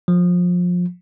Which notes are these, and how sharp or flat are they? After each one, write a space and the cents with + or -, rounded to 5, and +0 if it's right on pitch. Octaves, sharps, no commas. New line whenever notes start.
F3 +25